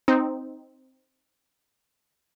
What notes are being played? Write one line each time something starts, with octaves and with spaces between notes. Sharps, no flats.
C4 D#4